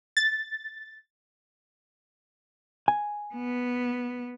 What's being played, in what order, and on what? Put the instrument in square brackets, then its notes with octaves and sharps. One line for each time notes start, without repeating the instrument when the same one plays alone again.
[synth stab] A6
[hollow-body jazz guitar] G#5
[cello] B3